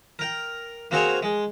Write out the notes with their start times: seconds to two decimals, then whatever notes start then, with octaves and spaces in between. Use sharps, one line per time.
0.19 A#4 G5
0.91 A#3 C4 F#4 G#4 C5 C#5
1.22 G#3